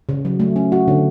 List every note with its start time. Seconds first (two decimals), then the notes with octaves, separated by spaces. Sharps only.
0.09 C#3
0.25 F#3
0.40 A3
0.56 C#4
0.72 F#4
0.88 D3